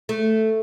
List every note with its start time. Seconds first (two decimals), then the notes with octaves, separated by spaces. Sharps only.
0.09 A3